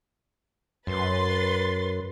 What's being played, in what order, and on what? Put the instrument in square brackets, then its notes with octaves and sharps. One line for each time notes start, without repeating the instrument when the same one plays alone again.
[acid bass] F#2 [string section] B4 C6 A6